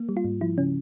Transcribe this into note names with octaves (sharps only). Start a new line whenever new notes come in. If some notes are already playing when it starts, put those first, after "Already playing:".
Already playing: A#3
G3
F4
G#2
F3 E4
C#3 C#4